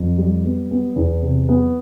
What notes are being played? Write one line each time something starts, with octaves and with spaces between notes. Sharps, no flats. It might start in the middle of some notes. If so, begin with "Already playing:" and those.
Already playing: F2
G3
B3
B3
E2
C3
B3